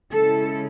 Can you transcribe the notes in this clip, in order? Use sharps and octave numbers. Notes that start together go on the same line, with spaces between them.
C#3 G#3 C#4 E4 A4